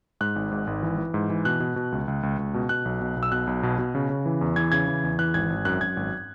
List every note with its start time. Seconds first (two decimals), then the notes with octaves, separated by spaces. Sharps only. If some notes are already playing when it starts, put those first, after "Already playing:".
0.21 G#2 F#6
0.36 G#1
0.51 G#2
0.67 G#1
0.83 E3
0.98 E3
1.14 G#2
1.30 E3
1.45 B2 F#6
1.60 B2
1.76 B2
1.92 C#2
2.08 C#2
2.23 C#2
2.39 C#2
2.54 B2
2.69 B2 F#6
2.85 B1
3.01 B2
3.16 B1
3.23 E6
3.32 B2 F#6
3.47 B1
3.63 B2
3.78 B2
3.95 C#3
4.10 C#3
4.26 E3
4.41 E2
4.56 E3 G#6
4.72 C#3 G#6
4.88 E3
5.03 E2
5.19 E3 F#6
5.34 G#1 G#6
5.50 G#1
5.65 F#2 F#6
5.81 F#2 G#6
5.97 G#1